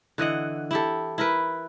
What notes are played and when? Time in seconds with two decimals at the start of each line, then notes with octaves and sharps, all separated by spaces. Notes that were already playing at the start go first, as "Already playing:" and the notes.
0.18 D3 E3 D#5 F#5
0.71 E4 G4 A4
1.18 E4 A#4 B4